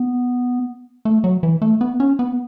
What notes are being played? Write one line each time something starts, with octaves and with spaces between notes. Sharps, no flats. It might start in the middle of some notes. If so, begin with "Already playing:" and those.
Already playing: B3
A3
F#3
E3
A3
B3
C#4
B3